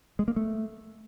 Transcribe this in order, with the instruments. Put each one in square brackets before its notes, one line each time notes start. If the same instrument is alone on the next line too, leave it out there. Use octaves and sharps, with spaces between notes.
[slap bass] G#3
A#3
A3